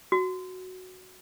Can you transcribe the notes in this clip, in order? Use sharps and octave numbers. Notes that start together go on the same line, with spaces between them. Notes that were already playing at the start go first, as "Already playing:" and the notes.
F#4